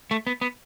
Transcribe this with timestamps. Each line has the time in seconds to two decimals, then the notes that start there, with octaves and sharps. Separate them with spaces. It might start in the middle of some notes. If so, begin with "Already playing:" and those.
0.11 A3
0.27 B3
0.41 B3